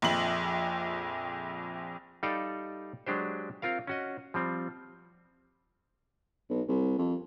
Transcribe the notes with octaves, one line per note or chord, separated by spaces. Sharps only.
A#1 F2 F#7
G3 D#4 A4 D5 F5 G5
F#3 G#3 D4 G4 C5
C4 F4 A#4 F5
C#4 F#4 D#5
F3 G3 C4
B1
C2
F2